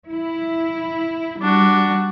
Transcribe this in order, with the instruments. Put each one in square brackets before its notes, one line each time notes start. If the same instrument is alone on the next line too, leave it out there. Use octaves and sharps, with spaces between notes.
[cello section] E4
[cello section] G3 [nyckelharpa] D4 F#4